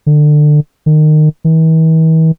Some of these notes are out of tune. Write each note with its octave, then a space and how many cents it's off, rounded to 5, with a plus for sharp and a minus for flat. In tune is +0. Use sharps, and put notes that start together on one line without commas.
D3 +25
D#3 -25
E3 -45